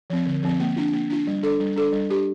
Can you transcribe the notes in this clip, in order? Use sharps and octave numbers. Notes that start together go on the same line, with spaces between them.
F3 C4
D3
F3 C4
A#3
D4 F4
A#3
D4 F4
G3
D4 A4
G3
D4 A4
G3
D4 G4